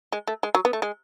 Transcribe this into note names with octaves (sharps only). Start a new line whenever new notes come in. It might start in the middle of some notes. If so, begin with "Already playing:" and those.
G#3
A3
G#3
F#3
B3
A3
G#3